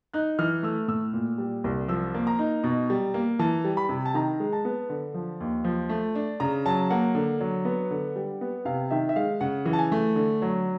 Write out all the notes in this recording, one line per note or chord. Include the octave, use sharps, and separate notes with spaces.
D#4 F#6
E3 F6
A3 E6
A2 E6
A#2
G3
C2
F3 E6
A#3
A#5
D#4
B2
G3
A#3
E3 A5
G3
B5
C3
A5
D#3 A#5
G#3
A5
B3
D3
F3
D#2
F3
A3
D4
C#3 A#5
F#3 A5
A#3 F#5
D3
F#3
B3
D3
G3
B3
C3 F5
D#3 E5
E5
G#3 F5
C#3 F#5
E3
A5
G#5
A3
D3
F#3